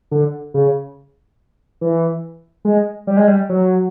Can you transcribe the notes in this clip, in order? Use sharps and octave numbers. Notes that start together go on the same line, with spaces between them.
D3
C#3
E3
G#3
G3
G#3
G3
F#3